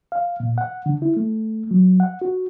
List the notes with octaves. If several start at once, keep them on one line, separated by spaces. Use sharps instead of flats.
F5
A#2
F#5
D3
E4
A3
F#3
F#5
F#4